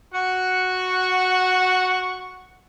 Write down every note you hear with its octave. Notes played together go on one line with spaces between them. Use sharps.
F#4 F#5 C#6